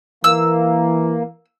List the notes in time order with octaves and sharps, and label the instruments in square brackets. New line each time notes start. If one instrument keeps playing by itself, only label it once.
[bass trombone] E3 [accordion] A#3 [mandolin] E6